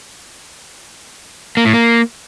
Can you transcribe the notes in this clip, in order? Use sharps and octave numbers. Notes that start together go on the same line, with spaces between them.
A#3
A2
A#3